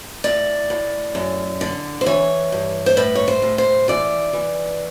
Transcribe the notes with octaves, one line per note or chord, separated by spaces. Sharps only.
A2 D5
A2
F#2
D3
C5
E3 C#5
G2
C5
A2 B4
C#5
C5
A2
C5
E3 D5
E3